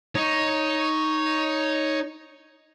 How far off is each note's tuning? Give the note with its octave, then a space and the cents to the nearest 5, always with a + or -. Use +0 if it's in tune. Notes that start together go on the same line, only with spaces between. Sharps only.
D#4 +5 C#5 +0